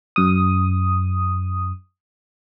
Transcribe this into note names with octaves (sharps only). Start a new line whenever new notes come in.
F#2 D#6